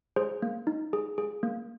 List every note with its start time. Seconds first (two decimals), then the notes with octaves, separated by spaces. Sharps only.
0.16 G#4 C5
0.42 A#3
0.67 D#4
0.93 G#4
1.18 G#4
1.43 A#3